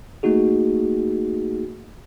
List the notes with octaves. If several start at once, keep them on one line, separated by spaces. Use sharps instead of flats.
A3 A#3 D#4 F#4 G#4